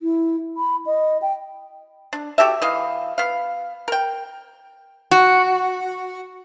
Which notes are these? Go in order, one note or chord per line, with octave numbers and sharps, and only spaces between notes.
E4
B5
D#5
G5
D4
F#4 G4 A4 E5
E3 D#5 F5
B3 F5
A#4 G5
F#4